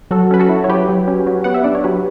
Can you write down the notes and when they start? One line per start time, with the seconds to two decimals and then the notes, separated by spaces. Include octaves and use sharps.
0.11 F#3 F#4 A4
0.31 C#4 B4
0.40 F#4 A4
0.49 E4
0.64 C#5
0.68 F#3 G4 B4
0.89 F#3
1.08 C#4
1.27 F#3
1.44 B3 F#5
1.54 E5
1.64 D4 D5
1.75 C#5
1.84 F#3 G4 B4